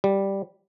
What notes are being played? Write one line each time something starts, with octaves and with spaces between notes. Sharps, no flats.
G3